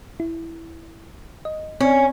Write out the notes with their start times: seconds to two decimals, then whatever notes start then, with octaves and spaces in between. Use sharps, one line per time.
0.20 E4
1.45 D#5
1.81 C4 C#4